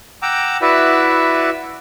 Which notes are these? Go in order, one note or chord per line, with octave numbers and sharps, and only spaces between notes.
F#5 G5 A#5 D6 E6
E4 F#4 B4 D5 E5